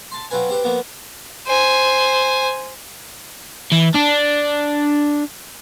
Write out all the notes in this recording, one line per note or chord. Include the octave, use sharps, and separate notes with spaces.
A5 C6
F#3 C4 F4 B4 G#5
C4 G4 B4
F3 A#3 B3
C5 G#5
E3
D4